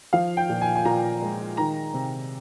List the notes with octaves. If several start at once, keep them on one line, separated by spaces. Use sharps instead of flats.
F3 F5
G5
A#2
G#5
G#5
A#2 A#5
G#3
D#3 A#5
C3